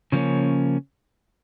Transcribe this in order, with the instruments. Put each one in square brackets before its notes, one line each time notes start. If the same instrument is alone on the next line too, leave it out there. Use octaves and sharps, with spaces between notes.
[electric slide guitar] C#3 F3 A#3 C#4